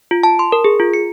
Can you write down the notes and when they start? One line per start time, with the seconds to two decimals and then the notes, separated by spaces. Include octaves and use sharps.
0.11 F4
0.23 A5
0.39 C6
0.52 A#4
0.64 G#4
0.80 F4
0.94 C#7